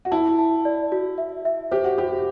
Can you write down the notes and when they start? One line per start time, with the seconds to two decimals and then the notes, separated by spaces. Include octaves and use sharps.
0.05 F#4
0.11 E4 A5
0.39 A5
0.65 D5
0.92 F#4
1.18 E5
1.45 E5
1.71 G4 C5
1.84 F#4
1.98 F#4 G4